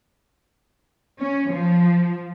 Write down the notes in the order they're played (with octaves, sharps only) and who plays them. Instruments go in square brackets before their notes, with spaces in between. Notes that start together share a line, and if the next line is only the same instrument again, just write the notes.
[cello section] C#4
F3